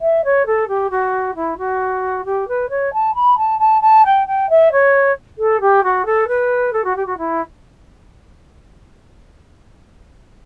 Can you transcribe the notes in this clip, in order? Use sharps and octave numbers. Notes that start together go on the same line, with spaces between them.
E5
C#5
A4
G4
F#4
E4
F#4
G4
B4
C#5
A5
B5
A5
A5
A5
G5
G5
E5
C#5
A4
G4
F#4
A4
B4
A4
F#4
G4
F#4
E4